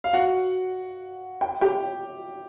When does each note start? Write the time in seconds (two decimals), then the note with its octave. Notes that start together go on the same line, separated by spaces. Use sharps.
0.04 F5
0.13 F#4 F#5
1.41 G5
1.61 G4 G5